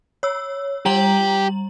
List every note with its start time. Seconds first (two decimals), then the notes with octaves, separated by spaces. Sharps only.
0.23 C#5 E6
0.86 G3 G4 A#5 F#7